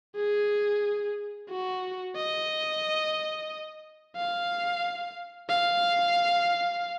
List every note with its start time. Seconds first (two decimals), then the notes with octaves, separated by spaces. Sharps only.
0.16 G#4
1.49 F#4
2.16 D#5
4.16 F5
5.49 F5